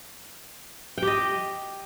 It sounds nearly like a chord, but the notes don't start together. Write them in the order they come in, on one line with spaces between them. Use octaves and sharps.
G5 G4 D#5